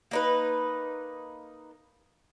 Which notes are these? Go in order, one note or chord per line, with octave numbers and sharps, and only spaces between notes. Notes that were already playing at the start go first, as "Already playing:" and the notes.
A#3 D#4 B4